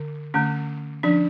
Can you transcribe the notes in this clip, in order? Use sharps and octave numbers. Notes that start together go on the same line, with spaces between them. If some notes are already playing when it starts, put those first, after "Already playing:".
Already playing: D3
D3 A3 C#4
F3 C#4 D4